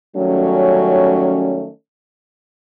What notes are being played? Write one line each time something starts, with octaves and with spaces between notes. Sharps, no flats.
D#3 F#3 G3 A3 C#4